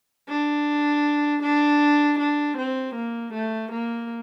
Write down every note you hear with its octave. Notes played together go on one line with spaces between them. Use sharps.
D4
D4
D4
C4
A#3
A3
A#3